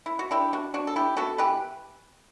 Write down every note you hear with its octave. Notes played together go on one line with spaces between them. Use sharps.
E4
F#4
D4 E4 G4
D4 F#4
D4 F#4
A4
D4 E4 G4
B3 F#4 A4
E3 G4 B4